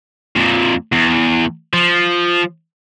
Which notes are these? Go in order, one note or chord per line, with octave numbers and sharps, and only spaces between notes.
F2 A#2
E2
F3